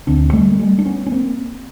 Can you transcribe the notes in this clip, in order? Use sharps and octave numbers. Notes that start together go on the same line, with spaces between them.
D2 D3 C4 D4
G3 A3
A#3
G3 A3
D4
B3 C#4
C#4
A#3 C4